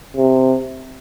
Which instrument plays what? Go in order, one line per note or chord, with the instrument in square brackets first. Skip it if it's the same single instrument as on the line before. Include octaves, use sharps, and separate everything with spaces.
[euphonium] C3